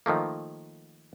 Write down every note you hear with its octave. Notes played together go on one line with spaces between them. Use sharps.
D#3 F3 A3 A#3